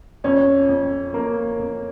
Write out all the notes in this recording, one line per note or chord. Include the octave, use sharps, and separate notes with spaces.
F2 C#4
F2
F2 A#3
F2